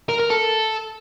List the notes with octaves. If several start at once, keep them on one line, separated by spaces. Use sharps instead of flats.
A#4
A#4
A4